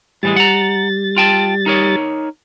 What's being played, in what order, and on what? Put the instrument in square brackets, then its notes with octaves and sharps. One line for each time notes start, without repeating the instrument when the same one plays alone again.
[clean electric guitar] A2 E3 G#3 [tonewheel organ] G3 A6
[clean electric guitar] F#5 A#5
F4 G5 A5
D#4 A#4 C#5